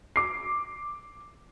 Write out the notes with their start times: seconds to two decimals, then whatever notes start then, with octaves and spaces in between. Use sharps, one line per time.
0.16 D6 C7